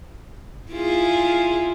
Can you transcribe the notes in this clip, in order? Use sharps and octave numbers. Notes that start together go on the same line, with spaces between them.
E4 F4 G#4